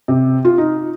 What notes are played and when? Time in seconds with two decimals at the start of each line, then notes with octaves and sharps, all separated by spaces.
0.08 C3
0.45 F4
0.58 D#4